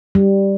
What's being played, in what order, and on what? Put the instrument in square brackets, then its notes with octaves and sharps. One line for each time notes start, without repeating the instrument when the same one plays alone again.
[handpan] G3